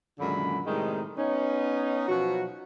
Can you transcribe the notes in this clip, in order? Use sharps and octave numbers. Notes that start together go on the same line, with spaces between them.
F#2 A#2 D3 D#3 G#3 B5
A2 C3 D#3 G3 G#3 D#4
B3 C#4 D#4
B2 F3 F#3 F#4